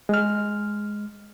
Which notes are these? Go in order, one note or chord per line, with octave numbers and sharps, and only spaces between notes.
G#3 F6